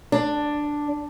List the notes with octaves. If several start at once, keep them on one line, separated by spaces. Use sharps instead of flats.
D4